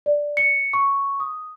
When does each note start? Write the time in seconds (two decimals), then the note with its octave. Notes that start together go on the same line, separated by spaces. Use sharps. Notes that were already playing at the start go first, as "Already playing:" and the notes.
0.06 D5
0.37 C#7
0.73 C#6
1.20 D#6